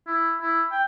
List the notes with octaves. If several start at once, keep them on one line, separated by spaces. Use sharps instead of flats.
E4
E4
G5